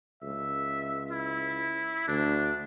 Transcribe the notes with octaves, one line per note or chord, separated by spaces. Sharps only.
C#2 E5
E4
D2 D4